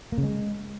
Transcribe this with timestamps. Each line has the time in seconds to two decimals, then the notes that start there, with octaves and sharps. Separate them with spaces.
0.12 A#3
0.18 C#3
0.23 G#3